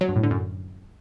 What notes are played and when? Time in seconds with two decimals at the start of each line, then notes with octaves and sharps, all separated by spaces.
0.01 F#3
0.08 G2
0.16 A2
0.23 D3
0.31 F#2